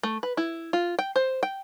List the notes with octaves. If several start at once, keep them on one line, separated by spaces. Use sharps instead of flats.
A3
B4
E4
F4
G5
C5
G5